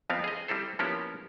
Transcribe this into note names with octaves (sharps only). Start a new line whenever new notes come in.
F2 F3 B3 C4 F5
G#4 D#5
G3 C4 E4 A4 C5
F3 A#3 B3 C#4 E4 G4